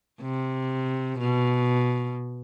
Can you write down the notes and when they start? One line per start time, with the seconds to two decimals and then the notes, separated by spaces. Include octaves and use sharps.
0.22 C3
1.18 B2